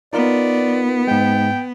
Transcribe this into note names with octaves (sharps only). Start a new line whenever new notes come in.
B3 D#4 F4 A#4 D5
G#2 G#3 G5